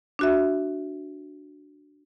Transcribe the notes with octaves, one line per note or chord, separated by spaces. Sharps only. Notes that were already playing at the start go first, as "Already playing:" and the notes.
D4 F#4 E5